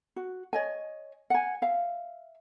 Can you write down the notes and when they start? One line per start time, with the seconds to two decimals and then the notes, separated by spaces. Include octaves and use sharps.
0.16 F#4
0.53 C#5 D#5 G#5
1.30 F#5 G#5
1.62 E5 F5